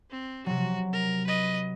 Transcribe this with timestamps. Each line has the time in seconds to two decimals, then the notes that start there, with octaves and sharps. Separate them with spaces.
0.10 C4
0.46 C3 F#3 F#4
0.93 A#4
1.27 B4 D#5